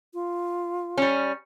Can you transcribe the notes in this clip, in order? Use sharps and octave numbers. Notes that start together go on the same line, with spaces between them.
F4
G3 C#4